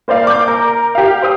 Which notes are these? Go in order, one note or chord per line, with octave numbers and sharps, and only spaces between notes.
A#3 C5 D5 F5
D6 G6
A#4
G4 F5
C5 G5 D#6